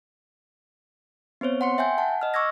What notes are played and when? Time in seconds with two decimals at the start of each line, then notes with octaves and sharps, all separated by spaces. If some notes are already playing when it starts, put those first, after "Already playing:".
1.41 B3 C4 C5 C#5
1.61 F#5 C6 C#7
1.78 E5 G5 G#5 G6
1.98 F#5 A5
2.21 D#5 F6
2.34 C#6 D6 E6 F6 G#6 A#6